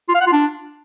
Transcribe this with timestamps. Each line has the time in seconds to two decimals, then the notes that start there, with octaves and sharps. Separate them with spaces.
0.09 F4
0.15 F5
0.21 F#5
0.27 F4
0.32 D4